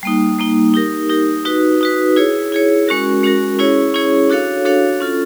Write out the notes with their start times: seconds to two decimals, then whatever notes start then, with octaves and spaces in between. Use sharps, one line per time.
0.03 G3 A#3 D#4
0.39 G3 A#3 D#4
0.74 D#4 G4 A#4
1.10 D#4 G4 A#4
1.45 D#4 F#4 B4
1.81 D#4 F#4 B4
2.16 E4 G#4 C#5
2.52 E4 G#4 C#5
2.88 G#3 C#4 F#4 A#4
3.23 G#3 C#4 F#4 A#4
3.59 C#4 E4 G#4 C#5
3.94 C#4 E4 G#4 C#5
4.30 D4 F#4 A4 C#5 F5
4.65 D4 F#4 A4 C#5 F5
5.00 C#4 F4 A4